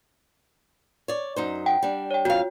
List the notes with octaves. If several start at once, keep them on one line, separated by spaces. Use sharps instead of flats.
C#5 D5
F#2 D#4 C5
F#5 G5
G3 D4
C#5 G5
F2 F#4 F5